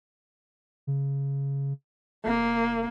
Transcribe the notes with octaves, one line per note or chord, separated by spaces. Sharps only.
C#3
F1 A#3